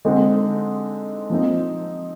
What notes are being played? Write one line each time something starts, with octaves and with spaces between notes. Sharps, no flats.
D3 G#3 C4 D#4
F3 C4 D#4